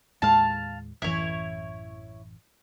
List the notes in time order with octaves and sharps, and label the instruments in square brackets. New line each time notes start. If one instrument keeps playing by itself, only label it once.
[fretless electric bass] D#2 A2 G#3 [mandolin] F5 A5
[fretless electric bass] A1 F#2 E3 [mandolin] E4 C#5